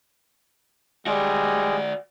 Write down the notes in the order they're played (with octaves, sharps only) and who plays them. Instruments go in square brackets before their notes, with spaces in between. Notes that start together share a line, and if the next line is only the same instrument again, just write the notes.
[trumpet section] G3 G#3 [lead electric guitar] F#4 D5